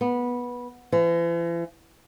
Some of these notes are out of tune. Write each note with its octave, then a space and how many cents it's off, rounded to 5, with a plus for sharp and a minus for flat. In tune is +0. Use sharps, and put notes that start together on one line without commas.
B3 -15
E3 +45